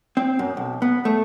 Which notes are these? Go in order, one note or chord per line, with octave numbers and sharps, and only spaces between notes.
C4
F#2
B1
B3
A3